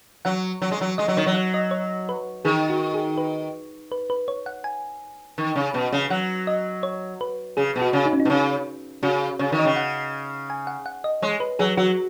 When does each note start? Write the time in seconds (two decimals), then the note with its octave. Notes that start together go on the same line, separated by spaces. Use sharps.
0.25 F#3 F#5
0.62 F#3
0.71 G#3
0.81 F#3
0.98 G#3 D#5
1.08 F#3
1.17 D#3 C#5
1.27 F#3
1.35 F#5
1.54 D#5
1.71 C#5
2.09 B4
2.45 D#3 G#4
2.70 F#4
2.94 G#4
3.18 B4
3.92 B4
4.10 B4
4.28 C#5
4.46 F#5
4.64 G#5
5.38 D#3
5.56 C#3
5.74 B2
5.92 C#3
6.10 F#3 F#5
6.47 D#5
6.83 C#5
7.21 B4
7.57 C#3 G#4
7.76 B2
7.82 F#4
7.93 C#3
8.06 D#4
8.13 C#4
8.20 D#4
8.25 B2
8.30 C#3
9.03 C#3 F#4
9.39 C#3 C#5
9.52 D#3
9.58 D#5
9.65 C#3
9.76 F#5
10.50 G#5
10.67 F#5
10.86 F#5
11.04 D#5
11.22 G#3 C#5
11.40 B4
11.59 F#3 G#4
11.77 F#3 F#4